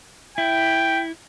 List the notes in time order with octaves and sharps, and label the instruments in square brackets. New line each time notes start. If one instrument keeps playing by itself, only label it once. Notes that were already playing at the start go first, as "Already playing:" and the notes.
[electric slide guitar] E4 [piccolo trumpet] G5